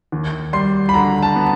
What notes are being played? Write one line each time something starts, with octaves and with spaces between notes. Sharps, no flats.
D#2
G3 C6
B5
D3 A#5
A5
B3